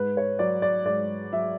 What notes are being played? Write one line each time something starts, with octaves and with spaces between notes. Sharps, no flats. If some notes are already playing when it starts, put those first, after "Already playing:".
Already playing: G#2 B4
C#5
F#3 D5
D5
G#2 D5
F#3 E5